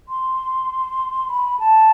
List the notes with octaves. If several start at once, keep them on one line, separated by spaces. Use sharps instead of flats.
C6
B5
A5